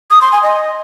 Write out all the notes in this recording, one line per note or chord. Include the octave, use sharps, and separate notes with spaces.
D#6
C6
G#5
D#5